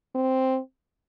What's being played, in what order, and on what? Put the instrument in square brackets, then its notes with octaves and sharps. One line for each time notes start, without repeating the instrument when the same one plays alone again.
[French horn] C4